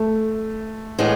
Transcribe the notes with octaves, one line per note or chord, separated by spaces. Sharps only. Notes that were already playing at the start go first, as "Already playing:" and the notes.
Already playing: A3
A2 E3 G#3 B3